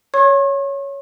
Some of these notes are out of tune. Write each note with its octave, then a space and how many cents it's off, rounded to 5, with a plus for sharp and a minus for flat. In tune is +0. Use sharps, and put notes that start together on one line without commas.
C#5 +5 C#6 -45